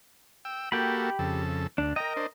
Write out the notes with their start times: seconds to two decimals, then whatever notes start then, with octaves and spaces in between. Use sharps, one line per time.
0.45 G5 E6
0.72 A#3 F#4 G4 A4 G5 B5
1.19 F2 C#3 A4
1.78 D2 D4
1.96 A#4 D#5 G5 A#5
2.16 D4 C5